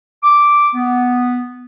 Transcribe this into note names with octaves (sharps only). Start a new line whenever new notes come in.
D6
B3